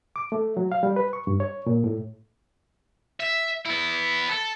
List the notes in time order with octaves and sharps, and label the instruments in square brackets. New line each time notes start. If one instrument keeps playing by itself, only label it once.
[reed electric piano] D6
A3
F#3
F5
G3
B4
C#6
G2
C#5
A#2
A2
[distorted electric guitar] E5
B3 E4
A4